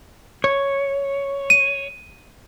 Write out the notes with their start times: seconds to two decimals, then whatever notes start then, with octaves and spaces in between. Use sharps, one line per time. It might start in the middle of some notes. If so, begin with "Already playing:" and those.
0.44 C#5
1.50 D#7